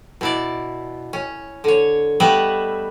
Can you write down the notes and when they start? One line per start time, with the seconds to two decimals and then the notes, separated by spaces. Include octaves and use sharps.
0.21 B2 E4 D5
1.13 C#4
1.64 D3 C#5
2.20 G3 A3 B3 B4 D#5 E5